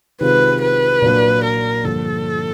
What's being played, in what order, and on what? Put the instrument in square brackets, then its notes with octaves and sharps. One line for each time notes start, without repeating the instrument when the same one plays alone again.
[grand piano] C3 D#3 G#3 C4 F4 [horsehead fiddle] B4
[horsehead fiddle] B4
[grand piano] A#2 F#3 A#3 D4
[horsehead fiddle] A#4
[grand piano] G2 D3 F3 A#3 [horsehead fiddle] A4